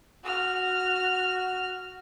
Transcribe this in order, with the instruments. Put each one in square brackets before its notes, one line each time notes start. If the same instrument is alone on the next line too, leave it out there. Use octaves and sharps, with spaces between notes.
[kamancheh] F#4 F6